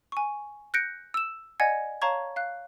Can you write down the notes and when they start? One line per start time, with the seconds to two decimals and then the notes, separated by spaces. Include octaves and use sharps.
0.12 G#5 C#6
0.74 F#6 G6 A#6 C#7 D7
1.14 E6 E7
1.60 D5 D#5 F#5 G#5 G#6
2.02 C#5 F5 A5 A#5 C#6 G#6
2.36 F5 F#6